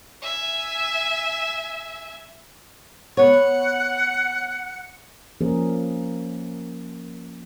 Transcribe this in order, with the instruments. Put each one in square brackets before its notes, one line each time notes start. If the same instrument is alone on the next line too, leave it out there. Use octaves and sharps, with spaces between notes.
[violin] E5 G#5
[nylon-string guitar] B3 C#5 [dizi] F#5
[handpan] F3 A#3 C#4 G4 G#4 A#4